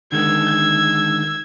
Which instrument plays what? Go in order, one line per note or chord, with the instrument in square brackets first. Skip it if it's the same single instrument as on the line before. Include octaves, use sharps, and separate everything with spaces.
[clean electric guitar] D3 D#3 G#3 [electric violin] E6 G#6